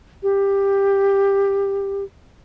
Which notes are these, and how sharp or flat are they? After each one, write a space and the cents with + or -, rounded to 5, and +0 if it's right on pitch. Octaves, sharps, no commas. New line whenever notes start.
G4 +15